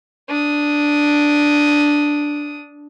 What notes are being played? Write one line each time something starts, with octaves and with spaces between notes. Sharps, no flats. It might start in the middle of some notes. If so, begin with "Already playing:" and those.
D4 D#6